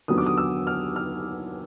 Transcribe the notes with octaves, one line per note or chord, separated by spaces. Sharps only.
D#2 D3 F#3 B3 D#6
D6
D#6
E6
F6
F6